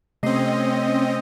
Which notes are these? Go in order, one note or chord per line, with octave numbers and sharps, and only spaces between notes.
C3 A3 C4 C#4 D#5 C7